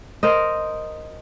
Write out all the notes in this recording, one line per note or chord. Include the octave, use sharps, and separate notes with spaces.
A#4 C5 D#5